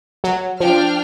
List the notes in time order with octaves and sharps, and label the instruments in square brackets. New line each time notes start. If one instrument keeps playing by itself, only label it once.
[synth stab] F#3
[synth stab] F3 [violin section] D4 G5 F6